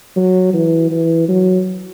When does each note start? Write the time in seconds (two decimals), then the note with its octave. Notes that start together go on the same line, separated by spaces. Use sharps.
0.16 F#3
0.54 E3
0.91 E3
1.28 F#3